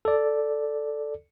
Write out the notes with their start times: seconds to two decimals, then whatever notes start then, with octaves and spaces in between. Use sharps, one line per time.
0.05 A4 D5